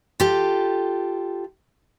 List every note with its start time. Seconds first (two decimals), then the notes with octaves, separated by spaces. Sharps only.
0.20 F4 G4 A4